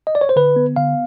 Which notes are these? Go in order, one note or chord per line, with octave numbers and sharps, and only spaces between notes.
D#5
D5
C#5
C5
D3 B4
B3
D3 F5